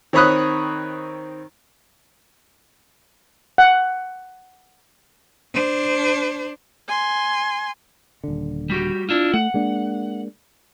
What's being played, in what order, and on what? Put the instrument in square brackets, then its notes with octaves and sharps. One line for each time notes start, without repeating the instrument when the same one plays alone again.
[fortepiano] D#3 C4 C#5 B5 D#6 F#6
[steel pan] F#5
[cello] D4 C5
[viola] G#5 C6
[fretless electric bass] D#1 D3
[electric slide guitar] G3 F#4 G4
D4 E4 F4
[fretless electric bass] A3 [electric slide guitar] F#5
[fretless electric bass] G#3 A#3 D4